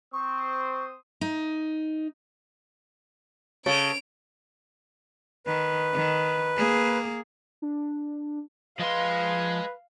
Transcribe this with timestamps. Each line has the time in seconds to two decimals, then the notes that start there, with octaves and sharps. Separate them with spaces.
0.13 C4 C5 C#6 D#6
1.21 D#4
3.66 C#3 A4 C#5 D7 F7
5.47 D#3 B4
5.93 D#3
6.56 A#3 G#4
7.62 D4
8.80 F3 G#3 B4 F5 C6